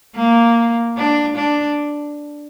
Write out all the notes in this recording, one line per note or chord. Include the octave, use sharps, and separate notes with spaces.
A#3
D4
D4